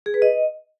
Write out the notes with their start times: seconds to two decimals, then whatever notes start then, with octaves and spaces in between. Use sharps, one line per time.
0.06 G#4
0.14 B4
0.22 D#5